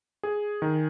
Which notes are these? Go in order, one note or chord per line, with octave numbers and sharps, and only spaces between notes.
G#4
D#3